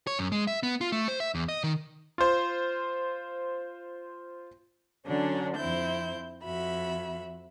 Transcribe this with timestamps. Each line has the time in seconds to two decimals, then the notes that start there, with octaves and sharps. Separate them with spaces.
0.07 C#5
0.19 F#2
0.32 G#3
0.47 E5
0.63 B3
0.81 F4
0.92 A3
1.08 C5
1.20 E5
1.35 E2
1.49 D#5
1.64 D#3
2.18 F4 C5
5.06 D3 F#3 C#4 D4
5.55 F2 C4 E4 G6
6.43 F2 F#4 E5 B5